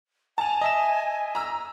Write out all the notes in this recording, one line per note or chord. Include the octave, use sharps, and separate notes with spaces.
G#5 A5 F7
D#5 E5 E7
A#5 E6